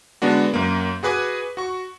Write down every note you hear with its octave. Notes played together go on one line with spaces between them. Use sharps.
D3 G#3 B3 D4 F#4
F#2 A#3
F#4 G#4 B4 G#5 D6
F#4 C#6